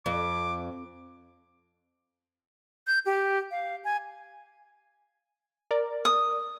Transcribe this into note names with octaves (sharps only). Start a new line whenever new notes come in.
F2 D6
G6
G4
F5
G#5
A#4 D5
D#6